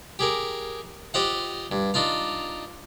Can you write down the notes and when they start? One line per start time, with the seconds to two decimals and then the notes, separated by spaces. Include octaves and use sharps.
0.19 G4 G#4 A#4
1.14 F4 G4 C5 D#5 F5 F#5
1.72 G2
1.94 D4 D#4 F4 F5